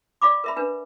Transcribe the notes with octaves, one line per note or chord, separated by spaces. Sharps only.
D5 F5 B5 D6
A#4 E5 B5
D4 B4